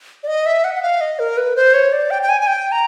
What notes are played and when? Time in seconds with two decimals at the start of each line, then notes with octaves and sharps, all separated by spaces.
0.23 D5
0.27 D#5
0.46 E5
0.64 F#5
0.75 F#5
0.82 F5
1.01 D#5
1.19 A#4
1.37 B4
1.56 C5
1.74 C#5
1.92 D5
2.11 G5
2.22 G5
2.29 G#5
2.41 G#5
2.47 G5
2.72 A#5